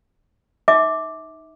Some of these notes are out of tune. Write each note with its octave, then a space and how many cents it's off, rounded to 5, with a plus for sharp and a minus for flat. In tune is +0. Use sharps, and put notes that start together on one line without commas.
D#4 +0 E5 -30 D6 +0